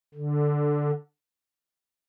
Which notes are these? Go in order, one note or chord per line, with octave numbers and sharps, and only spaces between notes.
D3